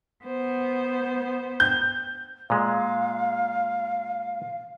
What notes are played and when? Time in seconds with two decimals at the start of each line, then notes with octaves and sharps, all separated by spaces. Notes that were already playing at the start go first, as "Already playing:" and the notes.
0.25 B3 C5
1.60 G6
2.50 A#2 G#3 F5